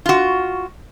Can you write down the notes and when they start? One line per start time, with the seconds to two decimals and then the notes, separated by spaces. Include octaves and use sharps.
0.06 F4 F#4